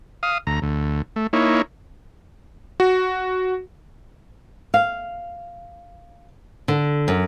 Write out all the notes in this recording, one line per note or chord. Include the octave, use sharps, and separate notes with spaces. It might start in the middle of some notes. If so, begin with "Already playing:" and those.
F5 D#6
D2 A#5
D2
A3
A#3 D#4 E4 C#5
F#4
F5
D3
F#2